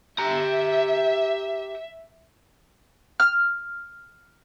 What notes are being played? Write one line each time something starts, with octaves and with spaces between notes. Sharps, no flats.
G4 E5 A#5
F6